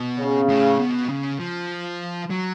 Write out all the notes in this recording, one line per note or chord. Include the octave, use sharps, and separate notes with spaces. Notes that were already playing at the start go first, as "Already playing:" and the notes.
Already playing: B2
C#3
A2
B2
C#3
F3
F#3